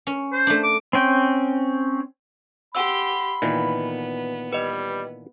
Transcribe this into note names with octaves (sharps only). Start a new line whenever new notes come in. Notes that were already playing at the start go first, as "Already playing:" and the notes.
C#4
C5
A3 D4
D6
C4 C#4 G5
G4 F#5 B5 C6 E6
A#2 D#3 E3 B3
G3 B4 D#5